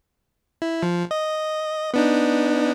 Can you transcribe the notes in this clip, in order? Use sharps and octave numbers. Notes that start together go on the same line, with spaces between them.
E4
F3
D#5
B3 D4 D#4